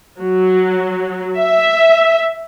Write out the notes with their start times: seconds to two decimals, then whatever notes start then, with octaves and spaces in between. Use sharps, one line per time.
0.20 F#3
1.38 E5